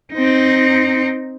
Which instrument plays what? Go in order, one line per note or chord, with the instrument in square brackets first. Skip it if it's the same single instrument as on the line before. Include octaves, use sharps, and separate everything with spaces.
[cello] C4 D#4